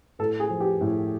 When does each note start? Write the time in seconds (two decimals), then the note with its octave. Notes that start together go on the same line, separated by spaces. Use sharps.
0.19 A2 A4
0.40 G#4
0.50 F3
0.60 G4
0.81 A2